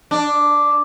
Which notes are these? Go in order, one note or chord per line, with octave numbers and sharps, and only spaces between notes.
D4